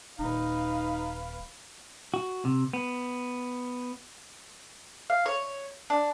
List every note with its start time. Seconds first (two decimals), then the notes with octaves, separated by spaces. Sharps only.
0.19 D#1 D#4 B4 F5
2.14 F#4
2.45 C3
2.73 B3
5.10 F5
5.26 C#5
5.90 D4